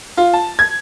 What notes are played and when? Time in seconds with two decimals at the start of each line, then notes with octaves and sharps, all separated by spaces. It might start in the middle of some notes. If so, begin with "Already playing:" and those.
0.17 F4
0.34 A5
0.59 G#6